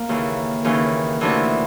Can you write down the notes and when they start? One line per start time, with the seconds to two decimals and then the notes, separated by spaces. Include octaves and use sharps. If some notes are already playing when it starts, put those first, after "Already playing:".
Already playing: A#3
0.09 D#2 C#3 E3
0.64 D#2 C#3 E3 C#4
1.21 D2 C3 E3 D4